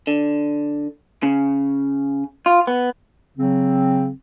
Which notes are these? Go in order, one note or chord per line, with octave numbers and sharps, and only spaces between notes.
D3
C#3
F4
B3
C#3 F#3 C4